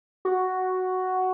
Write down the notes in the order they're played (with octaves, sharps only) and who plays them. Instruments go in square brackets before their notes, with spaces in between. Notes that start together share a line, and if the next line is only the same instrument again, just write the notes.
[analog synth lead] F#4